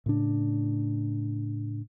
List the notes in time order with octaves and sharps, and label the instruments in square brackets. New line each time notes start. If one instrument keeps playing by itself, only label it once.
[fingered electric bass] A2 C#3 D4